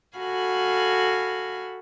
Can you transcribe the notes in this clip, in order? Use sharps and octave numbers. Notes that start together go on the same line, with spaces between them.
F#4 A4 F5 G#5 B5